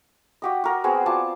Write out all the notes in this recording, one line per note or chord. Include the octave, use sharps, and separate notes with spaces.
F#4 G4 D#5
F#4 A#4
B3 C4 F#4 G#4
F4 D5 A5